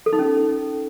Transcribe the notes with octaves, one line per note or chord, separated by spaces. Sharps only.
A4
D#4
C#4